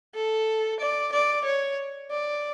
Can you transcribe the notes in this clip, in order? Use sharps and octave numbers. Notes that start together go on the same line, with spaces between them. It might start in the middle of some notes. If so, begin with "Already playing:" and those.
A4
D5
D5
C#5
D5